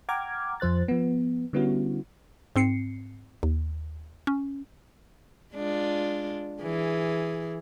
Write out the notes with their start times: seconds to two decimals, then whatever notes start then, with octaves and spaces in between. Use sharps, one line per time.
0.09 F#5 G5 A#5 D6 F6 G#6
0.60 F2 F3 C5 F#6 A6
0.88 F3 B3
1.53 D3 G3 B3 C#4 E4 F#4
2.56 G#2 C4 C7 C#7
3.43 D#2
4.27 C#4
5.53 G#3 D4 F4
6.62 E3 G#4